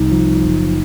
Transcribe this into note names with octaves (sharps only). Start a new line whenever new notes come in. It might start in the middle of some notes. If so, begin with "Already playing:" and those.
Already playing: C2 D#4
F3
F#1